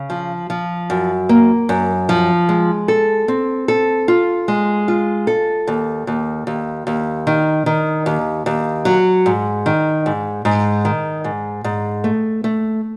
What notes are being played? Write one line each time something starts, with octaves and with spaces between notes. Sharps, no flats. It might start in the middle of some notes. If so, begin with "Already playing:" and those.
Already playing: C#3
F3
F3
F#2
A#3
F#2
F3
G#3
A4
C4
A4
F4
G#3
F4
A4
D#2
D#2
D#2
D#2
D#3
D#3
D#2
D#2
F#3
G#2
D#3
G#2
G#2
D#3
G#2
G#2
A3
A3